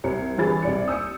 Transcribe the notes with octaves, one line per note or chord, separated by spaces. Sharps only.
C2 A#4 C#7
G1 G2 E3 G#4 B5 A6
C2 D5 C#7
D#6 E6 G6 C#7